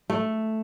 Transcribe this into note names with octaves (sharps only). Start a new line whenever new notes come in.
A3